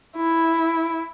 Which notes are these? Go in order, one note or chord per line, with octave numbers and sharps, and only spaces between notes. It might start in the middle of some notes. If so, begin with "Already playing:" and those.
E4